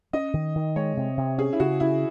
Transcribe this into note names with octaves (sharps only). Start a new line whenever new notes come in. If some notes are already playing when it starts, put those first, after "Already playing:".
C#4 D#5
D#3
D#3
G#3 C#5
C3
C3
C#4 G#4
E4
C#3 F#4
C#3 E4